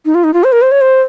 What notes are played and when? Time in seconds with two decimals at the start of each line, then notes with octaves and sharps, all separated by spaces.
0.05 D#4
0.15 F4
0.24 D#4
0.34 F4
0.44 C5
0.52 A#4
0.62 C5
0.71 C#5
0.81 C5